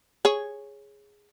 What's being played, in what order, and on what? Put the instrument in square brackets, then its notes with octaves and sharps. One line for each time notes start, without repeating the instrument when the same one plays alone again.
[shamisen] G#4 C#5